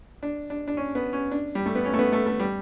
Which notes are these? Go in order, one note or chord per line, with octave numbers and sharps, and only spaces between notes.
D4
D4
D4
C#4
B3
C#4
D4
G3
A3
B3
C#4
A3
B3
A3
A3
G3